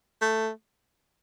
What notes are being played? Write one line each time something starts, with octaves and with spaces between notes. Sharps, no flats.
A3